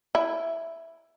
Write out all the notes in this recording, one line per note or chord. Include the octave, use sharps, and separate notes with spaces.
E4